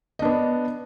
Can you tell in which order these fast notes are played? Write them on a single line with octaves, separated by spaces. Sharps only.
D#5 D4 B3